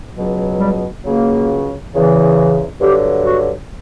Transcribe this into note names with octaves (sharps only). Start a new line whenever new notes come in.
C#2 B2 F#3
G3
C#2 C#3 F#3 A#3
E2 C#3 E3
G2 D3 F#3 G4
F#4